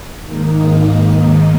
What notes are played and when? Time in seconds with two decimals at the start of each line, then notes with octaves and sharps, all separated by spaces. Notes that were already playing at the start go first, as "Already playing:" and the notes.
0.22 G#2 D#3 A#3 D#4